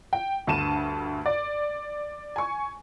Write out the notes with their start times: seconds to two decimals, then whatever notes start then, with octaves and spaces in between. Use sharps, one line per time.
0.13 G5
0.47 D2 G2 A5 D#7 E7
1.26 D5
2.36 G#5 C#6